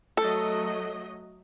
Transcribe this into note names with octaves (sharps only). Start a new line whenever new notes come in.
F#3 A3 A4 D#5